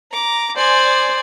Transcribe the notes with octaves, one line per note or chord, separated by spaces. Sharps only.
A#5 D6
C5 D5 G#5